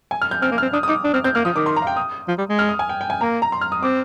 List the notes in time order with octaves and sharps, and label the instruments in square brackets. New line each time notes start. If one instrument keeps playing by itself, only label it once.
[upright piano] G#5
F6
G6
[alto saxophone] C4 [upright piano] F6
[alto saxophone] A#3
[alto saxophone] C4 [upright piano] F6
[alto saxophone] D4 [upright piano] D#6
[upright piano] D#6
[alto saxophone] D#4 [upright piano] D6
[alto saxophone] D4 [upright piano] D#6
[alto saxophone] C4 [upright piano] F6
[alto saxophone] C4 [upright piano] G6
[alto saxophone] A#3 [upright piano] F6
[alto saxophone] F3 [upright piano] D#6
[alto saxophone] D#3 [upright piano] D6
[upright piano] C6
A#5
F5
G5
D#6
[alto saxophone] F3
G3
G#3
[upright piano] F6
D#6
G#5
G5
G5
G#5
[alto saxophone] A#3 [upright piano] A#5
[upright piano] A#5
C6
F6
D#6
[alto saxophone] C4 [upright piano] D6